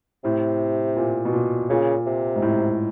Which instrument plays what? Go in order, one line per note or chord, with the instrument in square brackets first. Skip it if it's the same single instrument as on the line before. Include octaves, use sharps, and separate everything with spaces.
[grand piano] A2 [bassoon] C3
[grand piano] A#2
B2
A#2
[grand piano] A#2 [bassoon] C#3
[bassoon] C3
[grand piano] G#2
A2